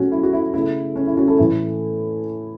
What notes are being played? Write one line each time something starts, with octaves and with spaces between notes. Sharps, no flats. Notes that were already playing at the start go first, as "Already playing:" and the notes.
Already playing: B2 F#3 A3 C#4 F#4
E4
F#4
E4
C#3 A3 E4
C#4
E4
C#4 F#4
E4 A4
A2 E3 A3 E4